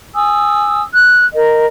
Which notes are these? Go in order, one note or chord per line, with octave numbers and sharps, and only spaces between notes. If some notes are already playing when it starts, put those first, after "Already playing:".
G#5 D#6 E6
F#6
A#4 D#5